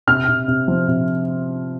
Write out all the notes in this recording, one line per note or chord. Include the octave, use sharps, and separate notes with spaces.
C3 F6
C3
C3
F3
C3